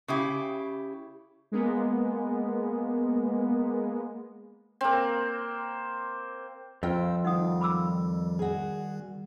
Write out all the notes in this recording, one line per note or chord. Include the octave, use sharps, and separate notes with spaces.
C#3 E4 G4
G#3 A#3 B3
A#3 C4
F2 F4 C5 G5 E6
D#3 G3 D#4 F#5 D#6
B5 D6 E6
F#4 G#4